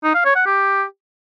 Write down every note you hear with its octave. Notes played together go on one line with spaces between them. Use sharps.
D#4
F5
C#5
F#5
G4